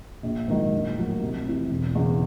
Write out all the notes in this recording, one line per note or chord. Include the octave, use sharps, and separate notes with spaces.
A#1
G#2 D#3 F#3
A#1
A2 F#3 A#3
C2
C3 E3
E1
E2 C#3